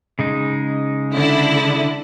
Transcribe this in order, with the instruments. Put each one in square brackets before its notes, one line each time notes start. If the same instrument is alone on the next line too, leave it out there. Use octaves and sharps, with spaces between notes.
[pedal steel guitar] C#3 G#3 D#4
[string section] D3 E4